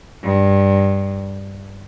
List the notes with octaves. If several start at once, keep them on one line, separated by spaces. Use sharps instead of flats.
G2